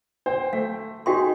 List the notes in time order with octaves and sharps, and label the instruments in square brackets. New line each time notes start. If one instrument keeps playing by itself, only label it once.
[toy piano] D4 [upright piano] C5 G5
[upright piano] A3 [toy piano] F5
[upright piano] D#4 G#4 C#6 [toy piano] F#4 G5 C6